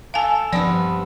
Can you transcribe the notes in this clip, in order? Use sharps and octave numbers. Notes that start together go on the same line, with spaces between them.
A4 F5 G#5
G2 F3 B3 C4 D5